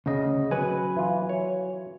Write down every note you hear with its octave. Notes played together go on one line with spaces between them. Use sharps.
D2 C#3 C#4 D#5
F#3 B4 G#5
E3 F4
C#5